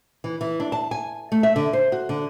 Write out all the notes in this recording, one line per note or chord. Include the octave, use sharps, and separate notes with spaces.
E3
E3
D4
A5
G#5
A3
E5
D3
C5
F#4
D3